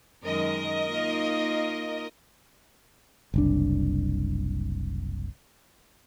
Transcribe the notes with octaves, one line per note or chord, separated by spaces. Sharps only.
F#2 D#3 G#3 A#4 D#5
A#3 D#4 F4
F#1 C2 D4